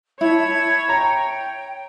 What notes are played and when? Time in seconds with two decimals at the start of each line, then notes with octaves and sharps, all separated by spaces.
0.21 E4 C#5 A5 B5 G#6
0.89 G5 A#5